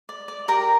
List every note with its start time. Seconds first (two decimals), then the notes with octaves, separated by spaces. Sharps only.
0.09 D5
0.28 D5
0.48 G4 A#4 A#5